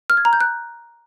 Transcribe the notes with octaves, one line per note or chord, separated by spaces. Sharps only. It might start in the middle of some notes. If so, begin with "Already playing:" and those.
F6
G#6
A#5
G6
F#6